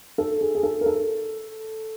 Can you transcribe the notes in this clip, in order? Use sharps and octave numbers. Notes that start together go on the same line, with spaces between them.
A4
G#4
G#4
A4
A#4
A4